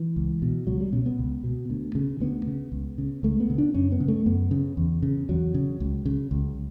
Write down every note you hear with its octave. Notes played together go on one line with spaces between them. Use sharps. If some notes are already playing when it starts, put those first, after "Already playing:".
Already playing: E3
C#2
B2
C#2 F#3
G3
B2 C#4
B3
C#2
B2
D2
C#3
D2 B3
C#3
C#2
C#3
C#2 A3
B3
C#3
D4
F#2 C#4
B3
C#3
A3
F#2 B3
C#3
E2
C#3
E2 F#3
C#3
C#2
C#3
C#2